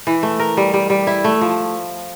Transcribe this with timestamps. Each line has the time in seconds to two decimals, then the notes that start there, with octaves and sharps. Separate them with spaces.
0.07 E3
0.23 A3
0.39 A#4
0.57 G3
0.74 G3
0.90 G3
1.07 E4
1.24 A3
1.41 F3